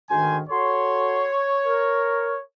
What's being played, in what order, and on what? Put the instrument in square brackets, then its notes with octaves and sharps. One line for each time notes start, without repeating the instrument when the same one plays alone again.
[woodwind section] D2 G#2 D#3 [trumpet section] C5 G#5
[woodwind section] F#4 A4 C6 [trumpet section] C#5
[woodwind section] A#4